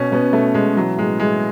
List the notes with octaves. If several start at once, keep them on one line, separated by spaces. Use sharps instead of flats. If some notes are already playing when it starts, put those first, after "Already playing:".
Already playing: B2 C#4
B2 B3
B2 A3
B2 G#3
E3 F#3
A2 G#3
A2 G#3